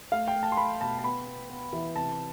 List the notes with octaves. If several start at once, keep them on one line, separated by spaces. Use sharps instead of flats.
A3 F5
G5
A3
A5
C6
A3 B5
B2 A5
A5
B3 B5
B3
B3
E3
C3 A5